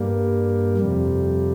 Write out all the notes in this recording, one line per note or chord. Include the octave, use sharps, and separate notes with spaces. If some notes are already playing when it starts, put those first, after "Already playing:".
Already playing: G2 G3 A#3
F2 C3 G3